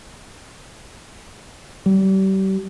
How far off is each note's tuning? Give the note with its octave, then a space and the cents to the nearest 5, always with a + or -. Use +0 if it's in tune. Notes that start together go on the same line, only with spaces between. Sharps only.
G3 -35